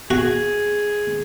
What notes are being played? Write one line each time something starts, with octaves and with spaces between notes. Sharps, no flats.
F#4 G#4